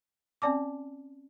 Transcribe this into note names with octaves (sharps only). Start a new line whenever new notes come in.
C4 C#4 D5 A5 D6